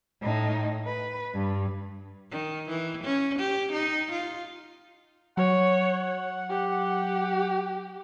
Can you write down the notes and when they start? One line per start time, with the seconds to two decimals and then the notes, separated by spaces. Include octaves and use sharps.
0.22 A2 D#4
0.86 B4
1.34 G2
2.31 D#3
2.69 E3
3.03 C#4
3.39 G4
3.72 D#4
4.12 F4
5.37 F#3 C#5 F#5
6.50 G4